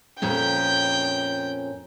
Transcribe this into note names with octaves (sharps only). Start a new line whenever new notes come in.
F2 A#2 C#4 G5 G6